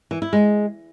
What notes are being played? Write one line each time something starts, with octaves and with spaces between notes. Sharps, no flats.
E3
E4
G#3